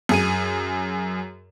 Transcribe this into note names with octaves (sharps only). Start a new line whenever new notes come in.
F#2 G#4 D#7